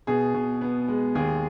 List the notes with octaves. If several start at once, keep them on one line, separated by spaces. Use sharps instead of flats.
B2 G#4
B2
B3
G#3
D#2 G#4